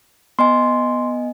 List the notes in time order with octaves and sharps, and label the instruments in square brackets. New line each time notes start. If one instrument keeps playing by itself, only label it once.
[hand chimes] B3 D#5 G#5 [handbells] C6